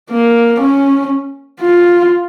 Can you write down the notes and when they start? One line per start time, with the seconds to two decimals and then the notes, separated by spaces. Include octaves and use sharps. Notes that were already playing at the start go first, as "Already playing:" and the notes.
0.10 A#3
0.60 C#4
1.61 F4